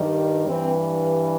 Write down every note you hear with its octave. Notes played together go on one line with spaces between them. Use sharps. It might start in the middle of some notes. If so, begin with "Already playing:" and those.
Already playing: G2 D#3 G3
G2 E3 G3 C4